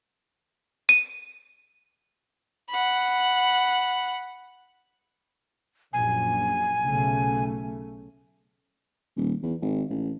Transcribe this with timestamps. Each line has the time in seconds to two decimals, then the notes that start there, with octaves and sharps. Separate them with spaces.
0.89 D#7
2.70 F#5 B5
5.93 A#1 F#2 G#5
6.82 B1 C#3 A3
9.16 D#1
9.42 E2
9.62 G#1
9.90 A1